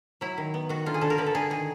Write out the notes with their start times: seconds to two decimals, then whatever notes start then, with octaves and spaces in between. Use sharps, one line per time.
0.21 F#3 E4
0.38 D#3
0.54 B3
0.69 D#3 F#4
0.86 D3 F4
0.94 G#4
1.01 D3 A4
1.10 A#4
1.18 D3 B4
1.26 A4
1.35 D3 G#4
1.50 D#3 G#4